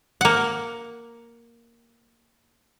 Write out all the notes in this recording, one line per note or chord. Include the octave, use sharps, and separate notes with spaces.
A#3 F#5